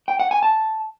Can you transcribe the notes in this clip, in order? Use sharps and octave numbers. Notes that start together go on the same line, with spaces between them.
G5
F#5
G#5
A5